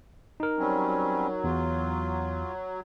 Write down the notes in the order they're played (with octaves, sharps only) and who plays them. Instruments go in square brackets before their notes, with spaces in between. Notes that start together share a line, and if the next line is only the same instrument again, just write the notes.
[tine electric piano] D#4 A#4
[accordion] F#3 [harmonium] G3 C4 C#4
[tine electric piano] E2 [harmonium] F4